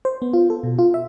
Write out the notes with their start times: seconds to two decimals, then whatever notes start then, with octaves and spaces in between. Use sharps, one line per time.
0.05 C5
0.22 B3
0.33 F4
0.50 A4
0.63 B2
0.79 F4
0.94 E5